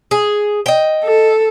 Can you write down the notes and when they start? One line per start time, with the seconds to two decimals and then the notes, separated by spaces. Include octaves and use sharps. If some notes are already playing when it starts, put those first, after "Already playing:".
0.11 G#4
0.66 D#5 G5
1.04 A4